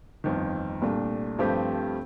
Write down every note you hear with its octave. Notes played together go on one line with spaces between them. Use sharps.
G1 F2 D#3
C2 A#2 A3 D4
G2 F3 A3 C4 G4